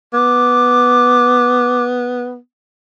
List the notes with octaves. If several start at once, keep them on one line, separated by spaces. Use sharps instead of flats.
B3 D6